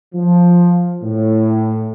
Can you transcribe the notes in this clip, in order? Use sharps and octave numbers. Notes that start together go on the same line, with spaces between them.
F3
A2